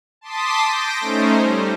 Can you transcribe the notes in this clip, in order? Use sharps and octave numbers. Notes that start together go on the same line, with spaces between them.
A5 C6 D6 D#6 B6
G6 A#6 D7
A3 C#4 D#4 C5
G3